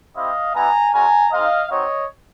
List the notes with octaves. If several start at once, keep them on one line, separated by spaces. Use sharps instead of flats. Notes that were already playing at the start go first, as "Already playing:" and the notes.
C4 E4 G4 D#5 F5
G3 B3 E4 G#5 A#5
G#3 C#4 F#4 G#5 A#5
G#3 C4 D#4 D#5 F5
C4 D#4 F#4 C#5 D#5